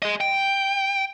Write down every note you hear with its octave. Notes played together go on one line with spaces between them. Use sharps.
G#4 D#5
G5